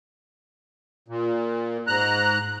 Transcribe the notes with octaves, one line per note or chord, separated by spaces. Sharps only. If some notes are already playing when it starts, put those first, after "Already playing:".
A#2
G#2 A#5 F#6